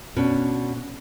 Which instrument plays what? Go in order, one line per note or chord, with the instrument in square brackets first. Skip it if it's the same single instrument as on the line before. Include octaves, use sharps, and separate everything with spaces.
[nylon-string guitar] B2 C#4 D4